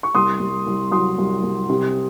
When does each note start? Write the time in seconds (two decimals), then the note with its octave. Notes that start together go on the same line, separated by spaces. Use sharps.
0.03 C#6
0.14 C2 C6 D#6
0.40 C2
0.67 C2
0.92 F#3 C6 D#6
1.18 C2
1.43 C2
1.69 C3